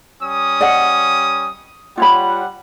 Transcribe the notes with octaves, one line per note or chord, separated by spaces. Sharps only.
G3 C#4 D#6
D5 D#5 F#5
G3 F4 C#5 F#5 B5